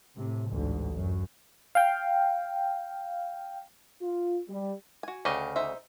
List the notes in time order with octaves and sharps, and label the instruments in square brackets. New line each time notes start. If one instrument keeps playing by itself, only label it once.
[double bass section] A2 C3
A1 D2 G#2
F#2
[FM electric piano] F5 G5
[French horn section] F4
G3
[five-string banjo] F#4 G#5
[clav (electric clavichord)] D2 C#3 D#5 [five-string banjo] G4 C#5
[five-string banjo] D#4 C5 E5